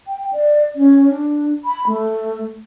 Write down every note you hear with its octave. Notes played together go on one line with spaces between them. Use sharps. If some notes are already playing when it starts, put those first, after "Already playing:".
G5
D5
C#4
D4
B5
A3